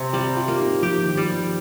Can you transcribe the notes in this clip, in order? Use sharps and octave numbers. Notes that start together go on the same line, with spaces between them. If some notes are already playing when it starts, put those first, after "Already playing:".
Already playing: C3 C4
G3 G4
F4
A#3
D#4
F3 G4
D#3
G3
F3